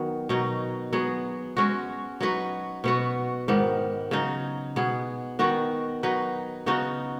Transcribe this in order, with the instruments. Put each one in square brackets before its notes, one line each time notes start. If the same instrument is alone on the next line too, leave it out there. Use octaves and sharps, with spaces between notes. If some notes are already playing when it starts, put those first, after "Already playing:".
Already playing: [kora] D#3 F#3 B3
B2 F#3 D#4
F#3 B3 G#4
G#3 C#4 F#4
F#3 D#4 F#4 B4
B2 B3 F#4 B4
G#2 D#3 B3
C#3 F#3 D#4
B2 B3 G#4
D#3 B3 F#4
F#3 D#4 B4
C#3 B3 D#4 F#4